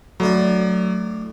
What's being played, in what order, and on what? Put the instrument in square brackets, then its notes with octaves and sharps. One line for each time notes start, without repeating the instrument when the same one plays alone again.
[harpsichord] A2 D4 [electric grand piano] F#3